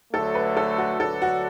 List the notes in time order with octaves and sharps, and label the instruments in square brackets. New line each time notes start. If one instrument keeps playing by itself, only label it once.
[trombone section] D2 D3 F#3 A3 [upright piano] A4
[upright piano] B4
A4
F#4
[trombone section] D2 D3 F#3 D4 [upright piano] A4
[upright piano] F#4